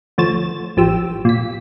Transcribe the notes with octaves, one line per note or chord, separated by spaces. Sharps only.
D2 F3 C#5 A6 E7
A1 F3 G4 E6
A#2 B6